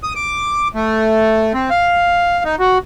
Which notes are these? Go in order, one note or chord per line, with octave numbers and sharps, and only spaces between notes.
D#6
D6
A3
C4
F5
D#4
F#4